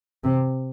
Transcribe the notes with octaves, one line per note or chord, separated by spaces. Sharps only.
C3